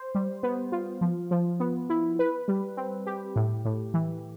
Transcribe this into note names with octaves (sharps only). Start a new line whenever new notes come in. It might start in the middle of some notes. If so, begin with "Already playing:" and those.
Already playing: C5
G3
B3
F4
F3
F3
B3
E4
B4
G3
C4
G4
A2
A2
E3